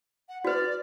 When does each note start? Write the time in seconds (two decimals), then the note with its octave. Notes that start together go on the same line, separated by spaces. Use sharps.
0.29 F#5
0.45 F#4 B4 D5